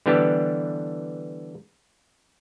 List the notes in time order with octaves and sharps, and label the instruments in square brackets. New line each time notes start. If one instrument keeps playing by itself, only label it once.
[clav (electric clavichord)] D3 E3 G3 B3 D4 G4